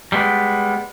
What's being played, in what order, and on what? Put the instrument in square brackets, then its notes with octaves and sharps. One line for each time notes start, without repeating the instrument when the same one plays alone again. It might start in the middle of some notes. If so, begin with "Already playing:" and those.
[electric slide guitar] G3 G#3 B3